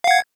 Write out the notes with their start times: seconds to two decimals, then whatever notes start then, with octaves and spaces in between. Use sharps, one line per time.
0.04 F5
0.07 F#5
0.11 G#6